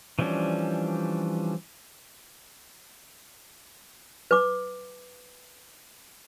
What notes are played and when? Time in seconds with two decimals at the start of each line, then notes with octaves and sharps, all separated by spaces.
0.19 E3 F3 G3 C#4 D4
4.31 B4 D6